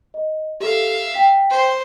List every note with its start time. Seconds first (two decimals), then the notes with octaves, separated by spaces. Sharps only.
0.14 D#5
0.60 G4 A4 E5 F5
1.14 G5 B6
1.50 C5